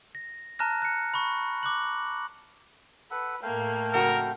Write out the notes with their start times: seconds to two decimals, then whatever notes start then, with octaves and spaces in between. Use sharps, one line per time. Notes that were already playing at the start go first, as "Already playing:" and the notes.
0.15 A#6
0.59 A5 A#5 F6 F#6 A#6
0.82 F#6 C#7
1.14 B5 C#6
1.63 D6 F#6 F#7
3.11 A4 B4 F#5
3.43 A2 A3 A#3 F5 G5
3.93 F2 C#3 F#4 A#4